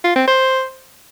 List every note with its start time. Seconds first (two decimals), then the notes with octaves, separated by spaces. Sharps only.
0.04 F4
0.16 C4
0.27 C5